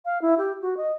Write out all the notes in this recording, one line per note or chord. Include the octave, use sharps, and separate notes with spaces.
F5
E4
G4
F#4
D#5